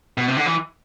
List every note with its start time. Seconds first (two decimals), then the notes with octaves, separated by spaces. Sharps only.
0.18 B2
0.28 C3
0.37 D3
0.46 E3